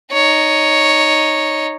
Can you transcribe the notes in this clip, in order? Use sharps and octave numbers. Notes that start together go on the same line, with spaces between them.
D#4 C#5